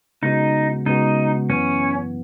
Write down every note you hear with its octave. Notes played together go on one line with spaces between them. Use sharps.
C#3 G#3 B3 D#4 F#4
C#3 G#3 B3 D#4 F#4
F#2 E3 B3 C#4